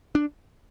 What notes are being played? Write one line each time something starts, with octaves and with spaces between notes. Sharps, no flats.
D4